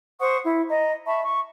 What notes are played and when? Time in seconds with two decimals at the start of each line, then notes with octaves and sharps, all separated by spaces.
0.19 C5 F#5 C#6 D#6
0.45 E4
0.70 D#5 A#5
1.06 E5 A5 B5 C#6
1.23 C#6